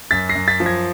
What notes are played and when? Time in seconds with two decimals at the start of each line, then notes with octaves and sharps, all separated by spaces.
0.11 F#2 A6 B6
0.29 A#6 C7
0.35 F#2
0.48 A6 B6
0.60 F3
0.66 G#6 A#6